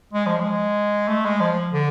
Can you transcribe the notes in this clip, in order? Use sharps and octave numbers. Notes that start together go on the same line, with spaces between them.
G#3
F3
G#3
A3
G#3
F3
D3